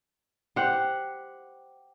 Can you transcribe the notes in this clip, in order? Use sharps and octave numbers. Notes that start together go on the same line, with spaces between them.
G4 C5 F#5